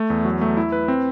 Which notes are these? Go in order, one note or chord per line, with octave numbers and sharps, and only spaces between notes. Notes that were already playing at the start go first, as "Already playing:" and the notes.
Already playing: A3
E2
F#3
A3
E4
B4
C4